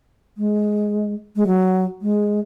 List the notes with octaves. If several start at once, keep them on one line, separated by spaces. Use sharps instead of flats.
G#3
G#3
F#3
G#3